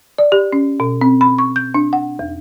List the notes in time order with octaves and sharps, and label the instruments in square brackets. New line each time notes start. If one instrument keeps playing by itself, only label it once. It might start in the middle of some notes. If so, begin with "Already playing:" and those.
[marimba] D5
G4
C#4
B2
C4
B5
C#6
G6
D4
F#5
E2